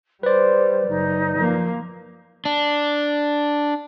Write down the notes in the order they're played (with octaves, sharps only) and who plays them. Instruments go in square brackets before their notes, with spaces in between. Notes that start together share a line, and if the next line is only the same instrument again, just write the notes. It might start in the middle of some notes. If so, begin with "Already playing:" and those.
[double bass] G3 [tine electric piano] B4 D5 [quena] C5
[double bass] F#1 [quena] D#4
[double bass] F3 A#3
[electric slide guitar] D4